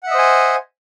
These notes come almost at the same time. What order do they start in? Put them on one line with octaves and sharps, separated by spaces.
F#5 E5 D#5 C5 G#5